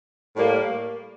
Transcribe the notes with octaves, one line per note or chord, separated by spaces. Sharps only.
A2 G3 A#3